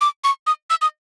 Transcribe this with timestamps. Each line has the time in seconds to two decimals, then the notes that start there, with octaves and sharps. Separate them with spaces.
0.01 D6
0.24 C#6
0.47 D#6
0.70 E6
0.82 D#6